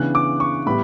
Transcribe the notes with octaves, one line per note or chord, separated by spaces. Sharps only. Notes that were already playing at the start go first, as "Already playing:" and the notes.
Already playing: C#3 E3 B3 D4 F#6
D6
C#6
A2 G3 B3 B5